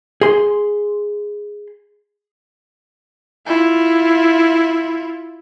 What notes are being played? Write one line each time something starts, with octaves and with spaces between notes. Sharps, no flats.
G#4 C6
E4 F4